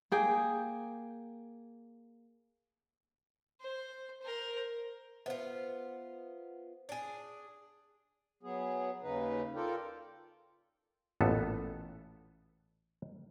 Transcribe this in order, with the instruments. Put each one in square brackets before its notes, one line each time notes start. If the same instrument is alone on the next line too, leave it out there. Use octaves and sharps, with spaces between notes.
[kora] A#3 G#4 G5
[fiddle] C5
A#4 C5
[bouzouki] B3 F4 [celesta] C5 E5
[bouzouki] D4 G#4
[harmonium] F#3 B3 G#4
D#2 C#3 D#4 B4
F4 A4 A#4 D5 G5
[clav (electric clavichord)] A1 A#2 B3 A4